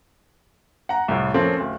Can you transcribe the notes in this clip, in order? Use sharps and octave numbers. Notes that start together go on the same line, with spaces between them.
F#5 A#5
C2 A2
F3 A3 A#3 C4 C#4
D1